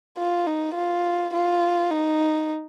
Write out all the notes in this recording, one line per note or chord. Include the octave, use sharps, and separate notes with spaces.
F4
D#4
F4
F4
D#4